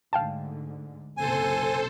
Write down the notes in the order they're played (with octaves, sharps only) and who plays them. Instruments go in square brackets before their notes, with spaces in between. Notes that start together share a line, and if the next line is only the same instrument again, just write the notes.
[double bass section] D2 G#2 D3 [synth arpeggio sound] F5 G5 A5
[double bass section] F#1 B1 C3 [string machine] A4 C5 [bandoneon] G#5